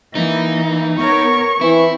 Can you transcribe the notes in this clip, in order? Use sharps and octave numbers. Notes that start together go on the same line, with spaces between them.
E3 A#3 D#4
B3 A#4 C#5 C#6
E3 C4 E4